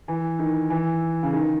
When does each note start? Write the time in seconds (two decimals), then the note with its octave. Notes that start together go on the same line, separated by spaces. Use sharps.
0.08 E3
0.39 D#3
0.70 E3
1.23 C#3
1.32 D#3